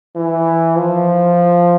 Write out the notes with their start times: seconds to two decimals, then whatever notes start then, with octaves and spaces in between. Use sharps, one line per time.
0.16 E3
0.77 F3